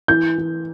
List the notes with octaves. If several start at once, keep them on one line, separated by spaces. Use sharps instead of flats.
E3 G6
E3